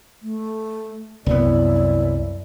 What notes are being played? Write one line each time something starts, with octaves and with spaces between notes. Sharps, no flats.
A3
C2 F#2 B3 E4 D5